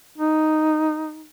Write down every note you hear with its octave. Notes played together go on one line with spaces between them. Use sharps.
D#4